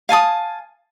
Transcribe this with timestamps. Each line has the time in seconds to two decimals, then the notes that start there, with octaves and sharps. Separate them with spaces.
0.09 F5 G#5 A5 D#6